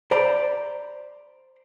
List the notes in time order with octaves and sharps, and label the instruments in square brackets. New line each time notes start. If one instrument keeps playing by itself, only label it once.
[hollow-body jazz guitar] C5 D5 A#5 B5